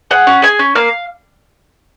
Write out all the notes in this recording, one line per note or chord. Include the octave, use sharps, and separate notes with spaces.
G#4 F#5
C#4
G#4 G#5
C#4
A#3 F5